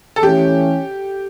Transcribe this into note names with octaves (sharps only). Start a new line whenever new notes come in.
A4
E3 A3 C#4 G4